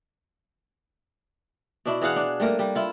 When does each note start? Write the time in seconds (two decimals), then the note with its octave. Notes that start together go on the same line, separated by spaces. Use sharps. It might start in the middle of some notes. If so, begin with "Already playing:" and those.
1.85 B2 D4 E4
2.01 E3 G#4 F5 F#5
2.16 D4
2.40 G3 A3 A#3 A#4
2.59 G3
2.75 E4 F4